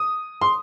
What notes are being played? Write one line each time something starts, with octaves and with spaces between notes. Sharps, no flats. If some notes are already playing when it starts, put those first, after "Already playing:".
Already playing: D#6
C6